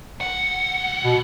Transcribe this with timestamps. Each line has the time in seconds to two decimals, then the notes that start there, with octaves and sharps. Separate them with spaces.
0.21 C#2 F#5
1.04 B2